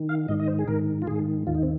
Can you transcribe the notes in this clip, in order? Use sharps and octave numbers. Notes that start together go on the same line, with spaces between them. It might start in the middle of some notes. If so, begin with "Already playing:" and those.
Already playing: D#3
F5
G#2 D#3 D#5
D#5
C5
G#4
G#2 D#3 A#4
F4
G#2 D#3 G#4
D#2 D#3 F4
D#4
C4